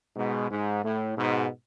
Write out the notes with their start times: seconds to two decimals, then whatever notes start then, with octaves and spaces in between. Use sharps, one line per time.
0.16 G#2 B2
0.50 G#2
0.83 A2
1.16 G#2 B2